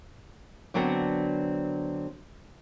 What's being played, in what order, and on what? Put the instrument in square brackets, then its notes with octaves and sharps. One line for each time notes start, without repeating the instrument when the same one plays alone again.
[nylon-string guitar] D3 F#3 B3 C4 D4